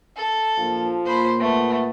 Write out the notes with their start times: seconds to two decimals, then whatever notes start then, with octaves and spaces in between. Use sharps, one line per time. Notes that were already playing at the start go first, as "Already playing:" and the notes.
0.16 A4
0.59 A#1 F3
1.05 A#2 C5 B5
1.40 A3 B3